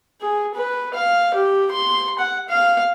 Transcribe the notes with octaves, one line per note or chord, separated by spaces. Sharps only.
G#4
B4
F5
G4
C6
F#5
F5